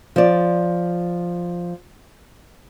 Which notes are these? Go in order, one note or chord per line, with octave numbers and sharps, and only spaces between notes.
F3 D5